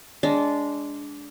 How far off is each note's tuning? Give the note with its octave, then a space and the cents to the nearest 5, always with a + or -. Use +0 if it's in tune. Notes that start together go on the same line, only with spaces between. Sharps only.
G#3 +0 D4 -15